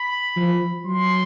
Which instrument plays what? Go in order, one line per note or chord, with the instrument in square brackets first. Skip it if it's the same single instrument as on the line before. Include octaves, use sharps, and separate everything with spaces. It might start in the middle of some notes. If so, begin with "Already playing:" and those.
Already playing: [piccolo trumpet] B5
[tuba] F3
[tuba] F#3 [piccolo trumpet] C6